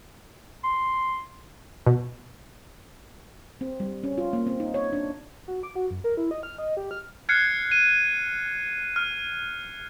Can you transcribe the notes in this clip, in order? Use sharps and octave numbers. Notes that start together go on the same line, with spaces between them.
C6
B2
C4
G3
C#4
F4
A#3
C4
D#4
C#5
D4
F#4
D6
F#4
F#2
A#4
E4
D#5
F6
D#5
G4
F6
F6 F#6 G#6 C7 C#7
D#7
F6